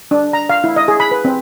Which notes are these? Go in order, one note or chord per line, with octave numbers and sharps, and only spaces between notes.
D4
A#5
F5
E4
D#5
G#4
B5
B4
C4